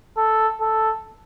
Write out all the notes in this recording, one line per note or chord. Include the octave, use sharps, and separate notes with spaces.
A4
A4